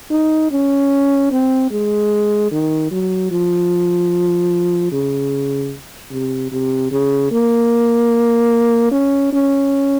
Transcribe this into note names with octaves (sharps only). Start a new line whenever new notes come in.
D#4
C#4
C4
G#3
D#3
F#3
F3
C#3
C3
C3
C#3
A#3
C#4
C#4